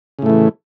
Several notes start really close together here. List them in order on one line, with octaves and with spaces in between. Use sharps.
C#3 A2 A3 E3